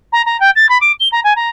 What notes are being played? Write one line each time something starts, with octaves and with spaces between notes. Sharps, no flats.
A#5
A#5
G5
A6
B5
D6
G7
A#5
G#5
A#5